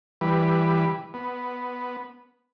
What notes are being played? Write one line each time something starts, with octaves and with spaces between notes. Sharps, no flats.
E3 G3 B4
B3